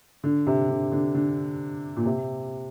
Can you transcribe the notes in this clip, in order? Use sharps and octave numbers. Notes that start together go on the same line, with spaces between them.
D3
C3
D3
D3
D3
A#2
C3